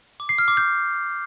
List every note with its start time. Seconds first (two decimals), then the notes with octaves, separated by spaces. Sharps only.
0.20 D6
0.29 C7
0.39 F6
0.48 D6
0.57 G6